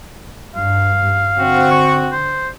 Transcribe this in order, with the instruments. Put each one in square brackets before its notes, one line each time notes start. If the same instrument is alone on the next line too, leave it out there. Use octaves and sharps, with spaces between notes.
[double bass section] G2 [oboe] F5
[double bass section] D3 [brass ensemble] C4 F#4
[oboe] C#6
C5